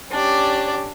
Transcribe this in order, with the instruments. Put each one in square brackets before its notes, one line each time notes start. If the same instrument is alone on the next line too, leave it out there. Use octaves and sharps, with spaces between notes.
[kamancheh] C#4 G4 [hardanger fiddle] D4 D5